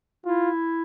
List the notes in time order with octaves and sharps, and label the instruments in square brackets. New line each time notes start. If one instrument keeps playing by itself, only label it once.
[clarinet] E4 [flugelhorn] F4